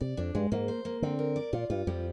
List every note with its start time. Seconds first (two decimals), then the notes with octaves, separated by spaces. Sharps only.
0.01 C3 D5
0.17 F2 D4
0.35 G2 G#3
0.52 G#2 A#3
0.68 C5
0.85 A#3
1.02 D3 C4
1.19 A#4
1.36 D5
1.53 A#2 F4
1.70 G2 F4
1.87 F2 G3